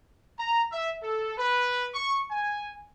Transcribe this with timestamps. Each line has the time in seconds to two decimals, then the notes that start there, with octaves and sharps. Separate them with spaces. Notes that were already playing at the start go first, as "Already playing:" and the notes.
0.38 A#5
0.71 E5
1.02 A4
1.38 B4
1.93 C#6
2.30 G#5